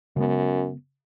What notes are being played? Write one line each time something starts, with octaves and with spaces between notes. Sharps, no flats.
F#2 C#3 G#3 B3